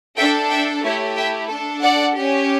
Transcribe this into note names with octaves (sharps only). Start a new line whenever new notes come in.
D4 A4 E5 G5
E5 G5
A3 E4 G4 C#5 E5
E5 G5
D4 A4
D5 F#5
C#4 G4